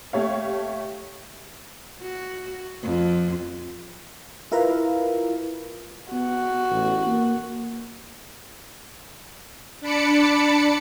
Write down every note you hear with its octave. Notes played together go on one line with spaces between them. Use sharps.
A3 G4 C#5 F5
F#4
F2
E4 F4 A#4 B4 F5
B3 F#4
A1
A#3
D4 A5 B5 D6 C#7